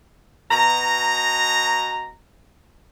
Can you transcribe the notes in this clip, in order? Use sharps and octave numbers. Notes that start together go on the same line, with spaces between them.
B2 A#5